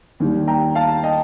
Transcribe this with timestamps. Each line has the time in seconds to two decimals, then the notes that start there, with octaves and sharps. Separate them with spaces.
0.20 D#2 D#3 G3
0.47 G5 A#5
0.75 F5 A5
1.03 D#5 G5